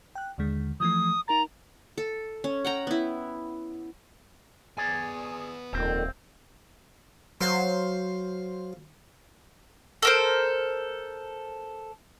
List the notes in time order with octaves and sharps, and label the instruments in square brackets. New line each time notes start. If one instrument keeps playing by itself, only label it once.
[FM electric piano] G5 F#6
D#2 D3 G#3
[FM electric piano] E3 F3 A3 [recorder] D#6
[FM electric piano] D#4 A#4 A6 [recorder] A#5
[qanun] A4
C#4
F#5 G5 A#5
B3 E4
[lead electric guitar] B3 G#5 [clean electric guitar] G#4 D5
[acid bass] D#1 [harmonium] F2 A#2 D#3 [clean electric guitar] C4
[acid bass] F#3 [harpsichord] C5 F5 C6
[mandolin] A4 A#4 C5